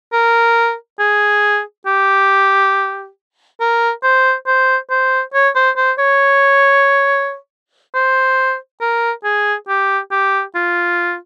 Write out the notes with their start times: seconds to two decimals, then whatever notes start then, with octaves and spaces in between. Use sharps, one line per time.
0.13 A#4
0.99 G#4
1.86 G4
3.60 A#4
4.03 C5
4.47 C5
4.90 C5
5.34 C#5
5.55 C5
5.77 C5
5.99 C#5
7.95 C5
8.81 A#4
9.24 G#4
9.68 G4
10.11 G4
10.55 F4